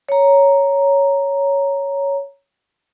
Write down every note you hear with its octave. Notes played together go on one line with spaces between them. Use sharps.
C#5 A#5